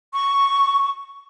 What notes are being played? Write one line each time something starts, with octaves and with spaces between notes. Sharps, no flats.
C#6